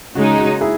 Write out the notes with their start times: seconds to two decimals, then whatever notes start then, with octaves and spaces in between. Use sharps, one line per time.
0.15 C#3 G#3 D#4 F#4
0.38 F#4
0.61 E4 G#4